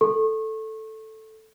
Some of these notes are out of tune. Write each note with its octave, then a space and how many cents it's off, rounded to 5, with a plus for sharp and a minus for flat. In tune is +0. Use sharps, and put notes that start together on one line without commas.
A4 +0 C#6 -30